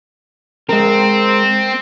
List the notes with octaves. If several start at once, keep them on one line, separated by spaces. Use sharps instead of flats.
G#3 C4 A#4